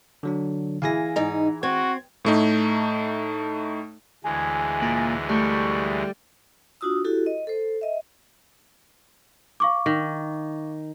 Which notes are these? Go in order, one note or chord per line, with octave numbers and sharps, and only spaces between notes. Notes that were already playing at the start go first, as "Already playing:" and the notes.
D3 F#3 D4
E3 E4 G#4 F5 G#5 A#6
G#2 D#4 A#5
C4 F#4 G#6
A2 A3 D#4
D2 E3 G#3 G#4 G#5
A#2
G3 A3 C#6
D4 F4 F#4 D#6 E6
E4 F#4 G4 A4
D#5
A4 C5
D#5 E5
F5 C#6 D6
D#3